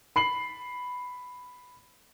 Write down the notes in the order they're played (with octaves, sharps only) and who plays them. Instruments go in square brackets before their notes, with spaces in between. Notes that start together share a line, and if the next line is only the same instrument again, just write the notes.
[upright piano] B5 C7 F#7